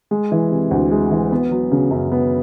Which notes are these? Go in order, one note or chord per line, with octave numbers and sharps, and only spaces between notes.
G#3
E3
C3
D2
G#3
E3
B3
F#3
C#3
F#2
B3